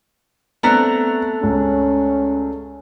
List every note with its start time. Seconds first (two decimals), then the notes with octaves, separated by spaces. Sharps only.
0.63 A3 B3 C4 D4 A#5 F#6
1.43 C#2 C#4